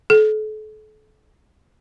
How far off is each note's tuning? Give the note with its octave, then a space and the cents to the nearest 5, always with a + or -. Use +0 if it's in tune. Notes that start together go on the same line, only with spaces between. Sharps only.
A4 -35